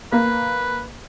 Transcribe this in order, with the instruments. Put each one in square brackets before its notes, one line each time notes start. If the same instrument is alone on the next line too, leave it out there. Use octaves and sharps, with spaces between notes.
[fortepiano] A#3 [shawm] B4